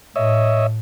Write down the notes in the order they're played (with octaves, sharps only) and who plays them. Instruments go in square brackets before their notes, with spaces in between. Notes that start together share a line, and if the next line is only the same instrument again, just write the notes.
[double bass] A2 [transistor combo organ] C#5 D#5 E5